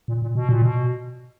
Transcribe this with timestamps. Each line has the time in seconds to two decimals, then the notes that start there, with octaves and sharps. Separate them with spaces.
0.08 A#2
0.22 A#2
0.35 B2
0.49 A#2
0.62 B2